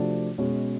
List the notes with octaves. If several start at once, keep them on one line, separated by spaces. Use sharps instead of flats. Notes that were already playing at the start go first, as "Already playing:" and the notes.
Already playing: C3 F3 A3 D4 F#4
B2 G#3 C#4